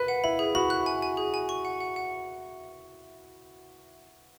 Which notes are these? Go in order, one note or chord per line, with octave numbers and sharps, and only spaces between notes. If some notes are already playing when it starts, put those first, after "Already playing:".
Already playing: B4 F#6
F#5
E4 B5
G#4
F#4 B5
F#6
G#5
G#5
G#4
G#5
C#6
F#5
F#5
F#5